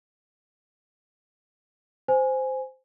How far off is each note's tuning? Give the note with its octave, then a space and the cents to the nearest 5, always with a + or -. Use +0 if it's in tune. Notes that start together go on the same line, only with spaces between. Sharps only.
C5 -10 G#5 +0